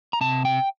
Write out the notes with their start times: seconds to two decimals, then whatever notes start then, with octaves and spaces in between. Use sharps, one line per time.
0.13 A#5
0.21 C3 A5
0.45 G5